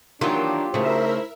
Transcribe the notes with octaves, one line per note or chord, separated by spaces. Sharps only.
D#3 E3 F#3 A#3 D4 F4 G4
C#3 A3 D#4 E4 A#4 C5 E5